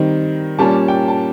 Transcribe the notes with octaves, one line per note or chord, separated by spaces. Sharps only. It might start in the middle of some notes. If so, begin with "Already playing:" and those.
Already playing: D#3 G3 C4 D#4
A#2 G3 A#3 C#4 A5
G5
A5